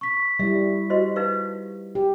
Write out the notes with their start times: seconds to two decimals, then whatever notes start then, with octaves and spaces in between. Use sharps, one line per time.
0.01 C#6 B6
0.39 G3 E4 E5
0.90 F#4 C5 D#5
1.16 D#4 B4 F5
1.95 G4